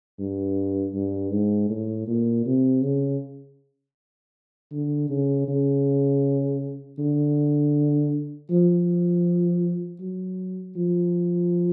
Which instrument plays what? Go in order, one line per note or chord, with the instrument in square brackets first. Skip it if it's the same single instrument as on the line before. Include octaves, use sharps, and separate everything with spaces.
[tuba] G2
G2
G#2
A2
A#2
C3
C#3
D3
C#3
C#3
D3
F3
F#3
F3